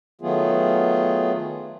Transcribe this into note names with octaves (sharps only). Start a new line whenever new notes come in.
D#3 F#3 A3 B3 F4 G#4